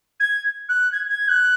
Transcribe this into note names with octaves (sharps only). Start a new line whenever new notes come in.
G#6
F#6
G#6
G#6
F#6